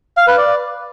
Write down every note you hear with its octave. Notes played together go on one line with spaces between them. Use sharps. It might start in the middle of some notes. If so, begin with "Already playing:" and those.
F5
B4
D5